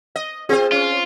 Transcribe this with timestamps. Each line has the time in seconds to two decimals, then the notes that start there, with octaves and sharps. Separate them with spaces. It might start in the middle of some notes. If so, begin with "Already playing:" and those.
0.16 D#5
0.49 C4 F4 G#4 C5
0.72 C#4 F4